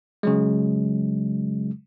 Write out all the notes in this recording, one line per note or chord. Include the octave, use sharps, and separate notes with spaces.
C#3 F#3 G#3